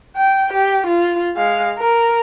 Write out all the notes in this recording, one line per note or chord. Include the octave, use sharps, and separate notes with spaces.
G5
G4
F4
G#3 F5
A#4